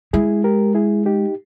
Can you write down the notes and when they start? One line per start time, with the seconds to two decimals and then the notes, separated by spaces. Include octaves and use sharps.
0.13 G#3 E4 G#4
0.44 G4 A#4
0.75 E4 G#4
1.06 D#4 G4